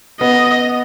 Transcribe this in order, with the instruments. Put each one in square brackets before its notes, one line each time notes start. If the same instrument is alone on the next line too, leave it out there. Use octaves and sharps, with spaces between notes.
[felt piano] B3 [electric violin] D#5